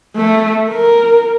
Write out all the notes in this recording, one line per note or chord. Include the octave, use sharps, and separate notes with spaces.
A3
A#4